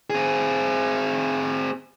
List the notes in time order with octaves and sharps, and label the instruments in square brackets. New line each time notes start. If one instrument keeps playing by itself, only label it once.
[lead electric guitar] C4 G#4